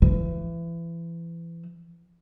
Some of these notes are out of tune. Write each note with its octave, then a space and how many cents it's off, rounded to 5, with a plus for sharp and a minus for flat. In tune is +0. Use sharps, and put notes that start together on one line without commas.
E3 +30